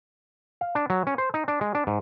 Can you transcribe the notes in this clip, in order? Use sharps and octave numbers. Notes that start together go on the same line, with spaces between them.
F5
D4
F#3
C#4
C5
D#4
D4
G#3
D4
G#2